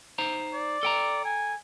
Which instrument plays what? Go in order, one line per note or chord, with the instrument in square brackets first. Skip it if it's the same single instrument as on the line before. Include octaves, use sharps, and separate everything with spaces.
[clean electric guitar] D#4 C5 A#5
[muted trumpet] D5
[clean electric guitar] A4 G5 A#5
[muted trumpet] G#5